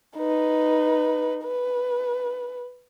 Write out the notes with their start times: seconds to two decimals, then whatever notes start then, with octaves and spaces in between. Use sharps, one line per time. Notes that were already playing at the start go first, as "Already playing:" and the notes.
0.17 D#4 B4
1.43 B4